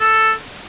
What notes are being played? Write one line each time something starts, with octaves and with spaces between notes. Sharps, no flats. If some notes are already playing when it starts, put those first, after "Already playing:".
A4